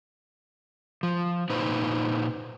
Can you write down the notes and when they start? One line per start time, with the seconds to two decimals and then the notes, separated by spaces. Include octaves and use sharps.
1.03 F3
1.50 A#2 D#4 B4 C5